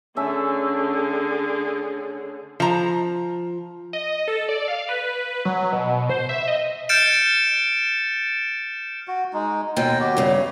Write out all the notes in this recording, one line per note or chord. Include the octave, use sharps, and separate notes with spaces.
D3 A3 C#4 G#4 E5
F3 A#5
D#5
A4
D5
F5
B4
F#3
B2
C5
E5
D#5
F6 G6 A6 C#7 D7 E7
F#4
G#3 D#4
D#2 B2 G5
F#4 G4
G2 C#3